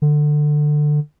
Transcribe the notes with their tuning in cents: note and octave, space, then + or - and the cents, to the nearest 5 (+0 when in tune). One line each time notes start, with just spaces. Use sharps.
D3 +20